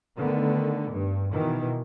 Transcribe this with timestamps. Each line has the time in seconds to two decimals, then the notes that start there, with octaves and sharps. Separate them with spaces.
0.17 D3 D#3 A3 B3
0.92 G2
1.33 B2 D#3 E3